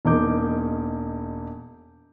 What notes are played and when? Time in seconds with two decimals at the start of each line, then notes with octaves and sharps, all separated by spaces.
0.05 E1 E2 A#3 D#4 D6 G6